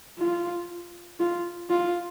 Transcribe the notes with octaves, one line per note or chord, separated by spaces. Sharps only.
F4
F4
F4